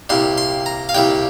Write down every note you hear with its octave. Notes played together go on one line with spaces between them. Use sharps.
C2 A#2 G3 C6
C6
A#5
F5
C2 A#2 G3 G5